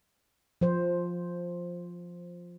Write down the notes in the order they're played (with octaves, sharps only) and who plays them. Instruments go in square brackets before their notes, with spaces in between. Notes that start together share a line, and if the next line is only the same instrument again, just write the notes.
[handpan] F3 C5